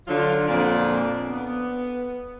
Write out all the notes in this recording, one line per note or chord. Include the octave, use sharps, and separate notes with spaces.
D3 F#3 F4
F2 A#2 D3 D4 D5 F5
B3